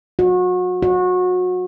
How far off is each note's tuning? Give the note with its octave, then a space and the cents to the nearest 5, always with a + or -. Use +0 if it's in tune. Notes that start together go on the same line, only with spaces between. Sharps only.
F#4 -30
F#4 -25